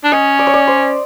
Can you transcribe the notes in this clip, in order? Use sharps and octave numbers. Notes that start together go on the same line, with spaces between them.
D4
C#4 D#5
D5
C#5
D5
C5